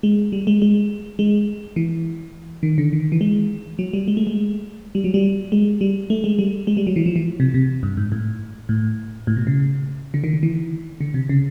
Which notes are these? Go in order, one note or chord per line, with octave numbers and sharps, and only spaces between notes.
G#3
G3
G#3
G#3
G#3
E3
D#3
D3
D#3
E3
G#3
F#3
G3
G#3
A3
G#3
G3
F#3
G3
G#3
G3
A3
G#3
G3
G#3
G3
F#3
E3
F3
E3
C3
C3
G2
G#2
A2
A2
A2
B2
C#3
D3
D#3
D3
E3
D3
C3
C#3